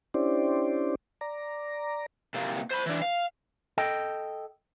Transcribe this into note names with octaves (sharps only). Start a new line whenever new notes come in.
C#4 D4 E4 G4 C5 D5
D5 A#5
C3 A#3
C5 B5
E3 D4
F5
A4 D#5 G5